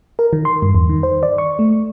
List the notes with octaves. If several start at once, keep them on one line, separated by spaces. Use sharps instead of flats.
A#4
D#3
C6
G2
E2
D#3
C5
D5
C#6
A3